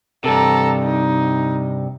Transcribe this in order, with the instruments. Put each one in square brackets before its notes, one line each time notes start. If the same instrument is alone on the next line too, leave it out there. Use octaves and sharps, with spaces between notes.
[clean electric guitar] G2 C3 [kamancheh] A4 A#5
[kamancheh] D#4